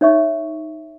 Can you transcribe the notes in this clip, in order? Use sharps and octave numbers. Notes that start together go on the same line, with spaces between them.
D#4 C#5 E5 C#6